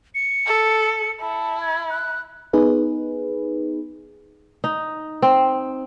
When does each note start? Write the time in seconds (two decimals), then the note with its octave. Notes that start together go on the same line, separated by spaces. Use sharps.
0.15 C#7
0.46 A4
1.21 E4 A5
1.61 G#6
1.90 F#6
2.53 B3 D#4 G#4 B4
4.64 D#4
5.22 C4